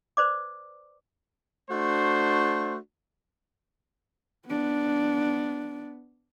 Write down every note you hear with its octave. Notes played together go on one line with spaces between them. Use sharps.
B4 C5 D5 D6
A3 D4 F#4 C5
B3 D4